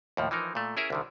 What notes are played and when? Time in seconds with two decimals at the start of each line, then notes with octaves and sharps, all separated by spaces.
0.17 D#2 A2 F3
0.31 E3 F3 D#4 A#4
0.55 A#2 A3
0.77 C#4 E4 G#4 A#4 E5
0.90 C2 D3 D#3